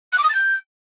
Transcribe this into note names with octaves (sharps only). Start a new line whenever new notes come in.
F#6
D6
D#6
A6
G6